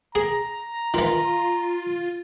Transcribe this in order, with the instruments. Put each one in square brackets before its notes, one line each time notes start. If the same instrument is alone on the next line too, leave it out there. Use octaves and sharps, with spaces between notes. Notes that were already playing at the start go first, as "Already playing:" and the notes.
[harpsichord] G#4 [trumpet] A#5
[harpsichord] D#3 E3 [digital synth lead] F4